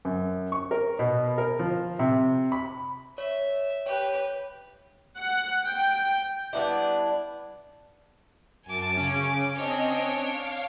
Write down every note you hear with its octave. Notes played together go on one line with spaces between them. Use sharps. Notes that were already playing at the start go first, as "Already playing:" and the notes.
F#2
C#6
A#4
B2
A#4
F3
C3
B5
C#5 E5
G4 B4 C#5
F#5
G5
G3 B3 D4 E4
F#2 G#5 A5 D6
C#3 C#4
C4 D4 C#5 D#5
F5